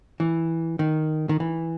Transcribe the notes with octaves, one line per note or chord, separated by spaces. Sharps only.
E3
D#3
D#3
E3